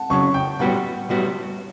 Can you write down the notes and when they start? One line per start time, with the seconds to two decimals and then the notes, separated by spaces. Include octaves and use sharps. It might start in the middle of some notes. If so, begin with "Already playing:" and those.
Already playing: F#5 A5
0.10 F#2 C#3 F#3 C#6
0.34 G5
0.59 B1 A2 G3 B3 F#4 F#5
1.09 B1 A2 G3 B3 F#4